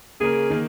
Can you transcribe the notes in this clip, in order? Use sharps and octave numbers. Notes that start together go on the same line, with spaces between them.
C#3 A#3 C#4 G#4 A#4
D#3 A#3